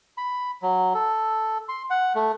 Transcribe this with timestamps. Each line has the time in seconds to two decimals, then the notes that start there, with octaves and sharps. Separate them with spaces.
0.18 B5
0.62 F#3
0.94 A4
1.69 C6
1.90 F#5
2.15 A3